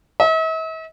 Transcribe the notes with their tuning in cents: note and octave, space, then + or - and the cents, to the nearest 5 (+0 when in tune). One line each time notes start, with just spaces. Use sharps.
E5 -45